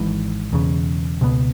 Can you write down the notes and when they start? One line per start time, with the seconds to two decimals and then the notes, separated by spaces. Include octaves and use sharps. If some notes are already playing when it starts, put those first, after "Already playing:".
Already playing: G#1 G#2 E3
0.53 E1 E2 C#3
1.21 C#2 B2 B3